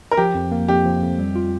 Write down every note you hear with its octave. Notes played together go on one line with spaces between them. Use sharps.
A#4
F3 G4
F2
A#3
F2 G4
F3
F2
G3
F4